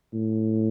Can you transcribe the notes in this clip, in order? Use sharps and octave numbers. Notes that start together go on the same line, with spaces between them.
A2